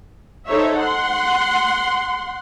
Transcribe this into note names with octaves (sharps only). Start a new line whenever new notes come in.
D#4 A4 C5 C#5 E5
F#5 C6